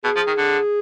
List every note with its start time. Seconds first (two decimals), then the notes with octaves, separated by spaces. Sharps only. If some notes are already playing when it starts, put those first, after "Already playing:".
0.04 B2 G#4
0.16 F3
0.27 D#3
0.38 D3